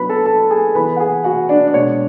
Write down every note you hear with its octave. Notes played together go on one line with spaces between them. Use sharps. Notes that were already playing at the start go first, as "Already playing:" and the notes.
Already playing: F#3 B3 D4 B4 B5
A4 A5
A4 A5
G#4 G#5
E3 B3 E4 B4 B5
F#5
G#4 G#5
F#4 F#5
D4 D5
D5
B2 G#3 D4 C#5